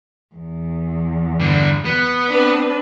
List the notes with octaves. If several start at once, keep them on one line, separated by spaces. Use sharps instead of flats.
E2
G2 D3
B3
C4 D4 B4